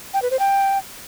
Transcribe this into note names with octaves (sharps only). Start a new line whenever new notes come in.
G5
B4
C5
G5